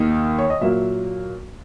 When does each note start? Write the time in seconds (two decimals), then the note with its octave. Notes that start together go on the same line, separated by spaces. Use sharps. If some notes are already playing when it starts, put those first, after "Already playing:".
Already playing: D#2 D#3 A#3 D#4
0.39 C#5
0.50 D#5
0.61 A#2 F#3 A#3 E5